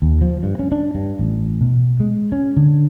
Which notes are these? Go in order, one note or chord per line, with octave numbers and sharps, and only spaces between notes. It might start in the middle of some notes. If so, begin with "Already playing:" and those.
D#2
F3
G2
C#4
D4
G2
A1
B2
G#3
C#4
D3